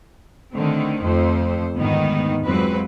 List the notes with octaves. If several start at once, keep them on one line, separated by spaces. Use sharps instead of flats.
D3 D#3 A3 C4
F2 A3 C5
D2 G#2 D#3 B3 D#4
F2 F#3 G#3 C4 B4